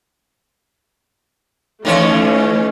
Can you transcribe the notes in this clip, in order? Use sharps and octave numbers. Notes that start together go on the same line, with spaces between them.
D#3 E3 A3 C#4 C#5